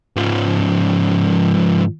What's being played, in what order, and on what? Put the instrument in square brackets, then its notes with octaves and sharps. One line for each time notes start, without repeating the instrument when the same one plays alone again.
[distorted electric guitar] G#2 F3